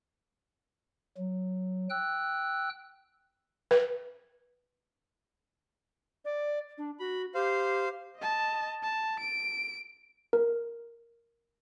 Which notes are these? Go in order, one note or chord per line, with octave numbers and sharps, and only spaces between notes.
F#3
G5 E6 F#6
B4
D5
D4
F#4 B5
G4 C5 F5
D#5 A5
A5
D7
A#4